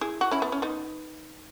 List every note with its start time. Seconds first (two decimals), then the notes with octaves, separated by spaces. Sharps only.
0.01 E4 G#4
0.21 F#4
0.31 C#4 E4
0.42 B3
0.52 C#4
0.62 B3 D#4